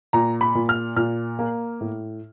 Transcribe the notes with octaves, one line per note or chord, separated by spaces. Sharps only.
A#2 A#5
B5
A#2
F6
A#2 F6
A#3
A2